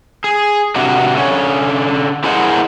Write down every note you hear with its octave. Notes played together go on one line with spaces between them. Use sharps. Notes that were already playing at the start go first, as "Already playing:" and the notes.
G#4
C3 D4 F#4
D3 C#4
E4 G#4 A#4 C5 D#5 F#5